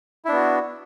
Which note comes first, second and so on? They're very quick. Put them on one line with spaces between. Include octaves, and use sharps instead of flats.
E4 D4 B3 F#4